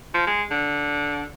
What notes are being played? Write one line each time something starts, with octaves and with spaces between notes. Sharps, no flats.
F3
G#3
D3